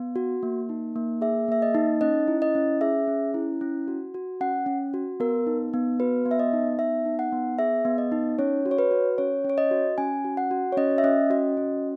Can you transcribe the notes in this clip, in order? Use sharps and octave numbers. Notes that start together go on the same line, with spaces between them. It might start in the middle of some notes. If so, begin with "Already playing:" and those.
Already playing: B3
F#4
A#3
D#4
A#3
G#4 E5
A#3 E5
D#5
D#4
C#4 D#5
E4
D#5
C#4
G#4 E5
C#4
E4
C#4
F#4
F#4
C#4 F#5
C#4
F#4
B3 A#4
D#4
B3
F#4 B4
B3
E5
D#5
D#4
B3 E5
D#4
F#5
B3
G#4 E5
B3
D#5
D#4
C#4 C#5
F#4
C#5
B4
F#4
C#4 C#5
C#4 C#5
D#5
F#4
C#4 G#5
F#4
F#5
F#4
C#5
C#4 D#5
E5
C#4 D#5
F#4 D#5
C#4